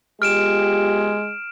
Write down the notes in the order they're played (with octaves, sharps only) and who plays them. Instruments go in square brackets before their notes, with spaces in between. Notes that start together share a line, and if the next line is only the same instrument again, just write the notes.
[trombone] G#3 [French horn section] B3 F4 G4 [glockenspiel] F6 D7 E7